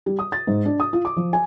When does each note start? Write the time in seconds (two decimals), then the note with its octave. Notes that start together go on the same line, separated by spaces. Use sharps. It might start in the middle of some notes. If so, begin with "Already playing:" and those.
0.06 G3
0.19 D#6
0.32 A6
0.47 G#2
0.65 D4
0.80 D#6
0.93 F4
1.05 D6
1.17 F3
1.33 G#5